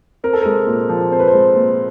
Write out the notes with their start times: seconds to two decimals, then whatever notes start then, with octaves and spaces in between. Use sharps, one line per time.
0.24 C4 A#4
0.33 A4
0.42 G#3 A#4
0.67 A#2
0.89 F3
1.11 C4 C5
1.20 B4
1.28 C5
1.34 G#3
1.56 A#2